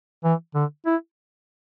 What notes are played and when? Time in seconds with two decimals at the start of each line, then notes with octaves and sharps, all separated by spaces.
0.24 E3
0.55 D3
0.86 E4